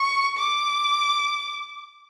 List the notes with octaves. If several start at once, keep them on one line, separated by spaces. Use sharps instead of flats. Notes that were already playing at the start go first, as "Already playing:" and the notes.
Already playing: C#6
D6